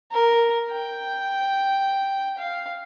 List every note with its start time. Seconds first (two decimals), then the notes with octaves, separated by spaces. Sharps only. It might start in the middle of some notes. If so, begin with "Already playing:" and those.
0.12 A#4
0.71 G5
2.38 F5